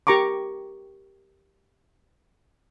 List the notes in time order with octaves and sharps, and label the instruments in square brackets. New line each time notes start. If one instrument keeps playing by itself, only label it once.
[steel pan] G4 A#4 A#5 C#6 D6